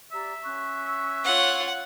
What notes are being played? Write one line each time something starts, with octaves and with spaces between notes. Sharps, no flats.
G4 D5 E5 A#5
C#4 C#6 F#6
F4 C#5 F#5